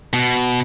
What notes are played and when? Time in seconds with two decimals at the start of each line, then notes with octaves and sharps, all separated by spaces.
0.13 B2